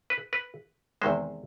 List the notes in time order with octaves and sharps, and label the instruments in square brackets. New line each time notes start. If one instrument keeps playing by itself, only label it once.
[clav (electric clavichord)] B4
B4
E2 C3 D#3 G#3 C5